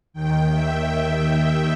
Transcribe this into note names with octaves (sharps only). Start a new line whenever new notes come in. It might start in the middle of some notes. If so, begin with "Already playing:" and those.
D#2 D#3 G5
E5